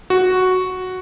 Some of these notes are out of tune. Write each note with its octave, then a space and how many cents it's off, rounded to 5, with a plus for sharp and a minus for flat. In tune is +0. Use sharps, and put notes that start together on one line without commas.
F#4 +0